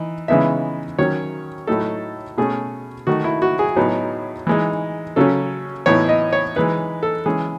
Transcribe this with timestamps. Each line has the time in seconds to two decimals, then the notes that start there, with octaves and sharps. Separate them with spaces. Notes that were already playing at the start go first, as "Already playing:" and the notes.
Already playing: E3 D#4
0.28 C#3 E3 G#3 B3 D#4 E5
0.98 D#3 F#3 C#4 C#5
1.67 A2 F#3 A3 D#4 A4
2.37 B2 A3 C#4 G#4
3.07 D#3 A3 D#4 F#4
3.24 E4
3.42 F#4
3.59 G#4
3.76 A2 F#3 B3 D#4
4.47 E3 G#3 D#4
5.16 C#3 F#3 C#4 A4
5.86 A2 E3 B3 D#4 C#5
6.09 D#5
6.33 C#5
6.56 E3 G#3 D#4 B4
7.03 A4
7.26 E3 G#3 C#4 G#4